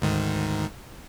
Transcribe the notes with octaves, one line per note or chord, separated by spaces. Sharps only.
D2 G#2 D#3